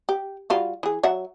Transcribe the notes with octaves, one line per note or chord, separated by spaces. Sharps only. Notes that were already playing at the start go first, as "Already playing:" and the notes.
G4
G3 F4 F#4
E3 G#4
F#3 E5 F#5